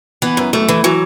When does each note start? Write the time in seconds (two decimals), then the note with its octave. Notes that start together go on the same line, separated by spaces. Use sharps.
0.22 E3 B3
0.37 F#2
0.53 F#2 A3
0.68 E3
0.84 E3 F#3